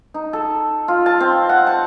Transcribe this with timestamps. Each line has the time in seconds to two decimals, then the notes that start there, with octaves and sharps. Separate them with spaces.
0.14 D#4
0.33 A4
0.88 F4
1.06 A5
1.20 C4
1.49 F#5
1.67 A5